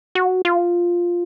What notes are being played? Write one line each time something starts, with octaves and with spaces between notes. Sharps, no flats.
F#4
F4